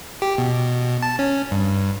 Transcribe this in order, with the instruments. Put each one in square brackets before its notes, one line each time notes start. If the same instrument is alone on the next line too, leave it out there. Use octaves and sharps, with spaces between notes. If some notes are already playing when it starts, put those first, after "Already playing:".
[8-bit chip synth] G4
B2
A5
C#4
G2